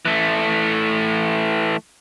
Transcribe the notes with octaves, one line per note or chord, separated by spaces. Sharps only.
E3 A3